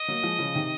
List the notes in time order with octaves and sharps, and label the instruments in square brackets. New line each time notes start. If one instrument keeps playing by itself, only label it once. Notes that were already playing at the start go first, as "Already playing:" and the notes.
Already playing: [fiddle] D#5
[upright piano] F#3 A#3
F3 G#3
C#3 F3
C3 D#3